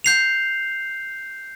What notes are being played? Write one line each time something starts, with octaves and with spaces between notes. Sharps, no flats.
G6 C7 F7